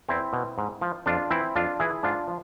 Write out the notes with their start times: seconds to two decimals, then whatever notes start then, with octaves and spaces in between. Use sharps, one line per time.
0.09 E2 C4 E4
0.33 B2
0.58 G#2
0.81 F3
1.06 F2 D4 F4
1.31 E3 C4 E4
1.56 F2 D4 F4
1.80 E3 E4 G#4
2.03 G#2 D4 F4
2.28 F3